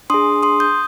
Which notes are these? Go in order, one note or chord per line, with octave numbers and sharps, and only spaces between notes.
D4 G#4 C6 D#6
C6 D#6
D#6 G6